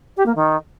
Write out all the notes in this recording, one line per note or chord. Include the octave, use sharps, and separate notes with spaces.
G4
A#3
D#3